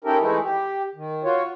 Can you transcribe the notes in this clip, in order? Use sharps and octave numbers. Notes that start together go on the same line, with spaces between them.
C#4 D#4 E4 G4 A4 A#4
E3 G#3 A3 D#4 E4
G4
D#3
F4 F#4 C#5